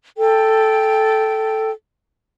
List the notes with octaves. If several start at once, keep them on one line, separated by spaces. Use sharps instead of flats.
A4 G5